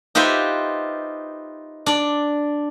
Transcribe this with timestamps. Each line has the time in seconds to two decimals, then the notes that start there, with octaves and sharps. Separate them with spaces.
0.15 D#4 F4 G4 B4 C5 E5
1.86 D4 D5